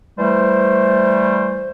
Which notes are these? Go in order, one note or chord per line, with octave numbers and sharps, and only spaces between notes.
E3 G3 A3 C5